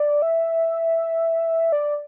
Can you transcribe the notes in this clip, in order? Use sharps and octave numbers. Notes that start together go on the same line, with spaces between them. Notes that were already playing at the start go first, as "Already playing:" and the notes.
Already playing: D5
E5
D5